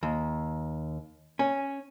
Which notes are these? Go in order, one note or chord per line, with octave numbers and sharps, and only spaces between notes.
D#2
C#4